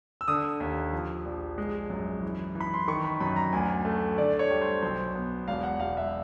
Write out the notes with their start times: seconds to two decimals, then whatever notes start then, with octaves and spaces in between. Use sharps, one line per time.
0.21 E6
0.28 D3 D#6
0.60 D#2
0.93 F3
1.25 A#1
1.58 G#3
1.90 F#2
2.22 E3
2.55 E3
2.60 B5
2.74 C6
2.88 D#3 C#6
3.04 B5
3.20 F#2 B5
3.36 A#5
3.53 D2 G#5
3.85 A3
4.18 D3 D5
4.39 C#5
4.50 G3
4.61 C5
4.82 B1 C5
5.15 B3
5.48 E1 F5
5.63 F#5
5.80 E1 F5
5.97 E5